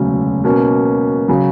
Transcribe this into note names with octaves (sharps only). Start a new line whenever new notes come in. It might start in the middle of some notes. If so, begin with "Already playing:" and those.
Already playing: E1 D2 C#3 F#3 C#4
B2 A#3 C#4
C#3 F#3